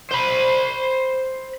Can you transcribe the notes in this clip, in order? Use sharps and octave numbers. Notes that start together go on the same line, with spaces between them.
C5 B5